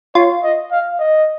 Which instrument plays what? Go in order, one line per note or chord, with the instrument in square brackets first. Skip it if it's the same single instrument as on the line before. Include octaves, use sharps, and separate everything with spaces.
[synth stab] F4 [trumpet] C#5
[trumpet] D#5
F5
D#5